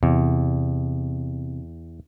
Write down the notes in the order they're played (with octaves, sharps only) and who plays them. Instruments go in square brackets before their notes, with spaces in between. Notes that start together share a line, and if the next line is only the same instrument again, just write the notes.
[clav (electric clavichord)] E2 [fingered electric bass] C3